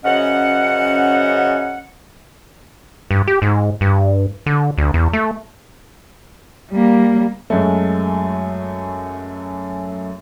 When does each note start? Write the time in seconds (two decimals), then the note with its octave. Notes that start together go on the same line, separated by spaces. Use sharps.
0.05 F#2 C#3 C#4 C5 D#5 F#5
3.11 G2
3.27 G4
3.42 G#2
3.81 G2
4.46 D3
4.78 D2
4.94 E2
5.13 A3
6.71 G3 A#3
7.50 F#2 F#3 G#3 A3